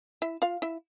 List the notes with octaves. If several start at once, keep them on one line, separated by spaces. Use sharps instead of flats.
E4 E5
F4 F5
E4 E5